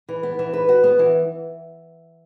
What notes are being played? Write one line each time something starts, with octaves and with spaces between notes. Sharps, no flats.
E3
B3
E3
B4
F#4
B3
E3